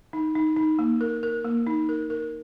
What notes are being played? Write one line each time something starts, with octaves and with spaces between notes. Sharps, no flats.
D#4
D#4
D#4
A#3
A#4
A#4
A#3
D#4
A#4
A#4